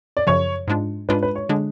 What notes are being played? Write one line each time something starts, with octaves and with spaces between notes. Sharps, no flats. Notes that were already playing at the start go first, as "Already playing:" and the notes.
D5
F#2 C#3 F3 C#5
G#2 G#3 D4 F4
G#2 G#3 D4 F4 B4
B4
C#5
D3 G#3 D4 G#4